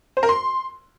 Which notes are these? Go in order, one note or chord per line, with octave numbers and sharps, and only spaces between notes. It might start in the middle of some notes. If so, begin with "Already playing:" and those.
C5
A#4
C6